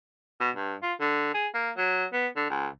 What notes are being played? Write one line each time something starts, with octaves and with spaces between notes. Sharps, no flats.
B2
G2
F4
D3
G#4
A#3
F#3
B3
D3
C#2